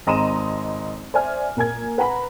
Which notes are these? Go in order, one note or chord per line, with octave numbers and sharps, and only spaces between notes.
G#1 D#5 A#5 C6 D#7 E7
C5 D5 E5 G#5 F6
A#2 A#4 G#5 G#6
B4 F#5 A#5 B5